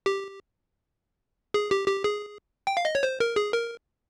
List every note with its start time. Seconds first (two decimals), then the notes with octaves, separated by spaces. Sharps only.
0.06 G4
1.54 G#4
1.71 G4
1.88 G4
2.04 G#4
2.67 G5
2.77 F5
2.85 D#5
2.95 C#5
3.03 C5
3.20 A#4
3.36 G#4
3.53 A#4